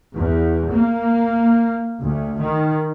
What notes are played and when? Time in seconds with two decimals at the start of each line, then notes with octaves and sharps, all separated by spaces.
0.13 E2
0.70 A#3
2.01 D2
2.40 D#3